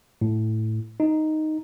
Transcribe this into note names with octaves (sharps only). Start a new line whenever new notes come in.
A2
D#4